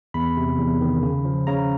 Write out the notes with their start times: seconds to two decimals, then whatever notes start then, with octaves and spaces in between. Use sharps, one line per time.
0.14 E2 B5
0.37 C3
0.59 E2
0.81 D#3
1.03 C#3
1.25 F3
1.47 C#3 A#5